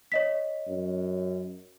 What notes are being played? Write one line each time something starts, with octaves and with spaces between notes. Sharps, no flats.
C#5 D#5 B6
F#2